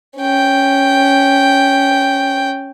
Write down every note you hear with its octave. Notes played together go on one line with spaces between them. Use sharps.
C#4 G5